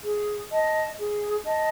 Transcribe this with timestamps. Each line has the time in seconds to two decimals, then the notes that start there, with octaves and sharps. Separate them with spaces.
0.04 G#4
0.51 D#5 A5
0.98 G#4
1.45 D#5 A5